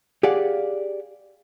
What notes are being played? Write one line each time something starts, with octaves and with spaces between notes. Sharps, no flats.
G4 G#4 D5 F5 F#5